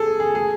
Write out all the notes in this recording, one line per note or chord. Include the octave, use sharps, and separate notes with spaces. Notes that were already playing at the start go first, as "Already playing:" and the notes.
Already playing: G#4 A4
G#4
G#4